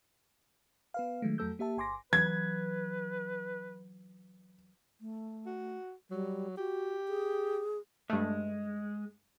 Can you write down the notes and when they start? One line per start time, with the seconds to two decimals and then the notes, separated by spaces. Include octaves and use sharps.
0.94 B3 B4 F5
1.22 D#3 F#3 G#3 A3
1.38 F2 F#3 A3 A4 E6 G6
1.59 A#3 G4 E5 A5
1.77 G1 G#5 C6 D6 A#6
2.13 E3 F#3 B4 G#6
5.01 A3
5.46 F#4
6.11 F#3 G3
6.57 F#4 G4
7.08 G#4
8.10 G2 G#3 A3